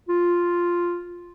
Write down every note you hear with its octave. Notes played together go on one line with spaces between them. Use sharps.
F4